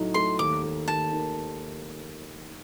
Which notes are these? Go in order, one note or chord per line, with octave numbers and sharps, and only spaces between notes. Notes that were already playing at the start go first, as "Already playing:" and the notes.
Already playing: A2 F#3 A3 D#4
A3 C6
D#2 D6
A3
D#2 A5
D#3